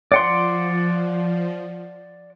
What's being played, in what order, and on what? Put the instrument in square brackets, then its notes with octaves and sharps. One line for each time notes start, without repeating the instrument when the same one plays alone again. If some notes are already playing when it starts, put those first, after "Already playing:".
[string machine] F3 [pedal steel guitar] D5 F#5 C6